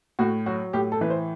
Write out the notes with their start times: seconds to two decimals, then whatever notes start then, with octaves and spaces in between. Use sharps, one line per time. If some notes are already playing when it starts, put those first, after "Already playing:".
0.19 A2 F#4
0.46 F#3 F#4
0.73 A2 G4
0.92 A4
1.01 E3 B4
1.10 C5